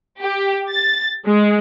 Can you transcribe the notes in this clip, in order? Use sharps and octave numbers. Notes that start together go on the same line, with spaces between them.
G4
A6
G#3